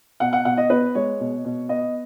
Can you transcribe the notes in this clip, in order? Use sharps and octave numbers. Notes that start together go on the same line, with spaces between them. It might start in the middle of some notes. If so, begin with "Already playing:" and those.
B2 F#5
F#5
B2 F#5
D#5
B3 B4
G#3 C#5
B2
B2
B3 D#5